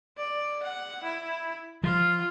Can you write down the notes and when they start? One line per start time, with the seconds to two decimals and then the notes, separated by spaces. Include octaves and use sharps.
0.17 D5
0.63 F#5
1.04 E4
1.84 F3 F4